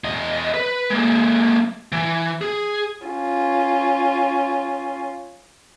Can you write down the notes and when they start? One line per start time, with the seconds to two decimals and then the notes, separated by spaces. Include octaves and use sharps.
0.04 E2 D#5
0.54 B4
0.90 G#3 A#3
1.92 E3
2.41 G#4
3.07 C#4 F4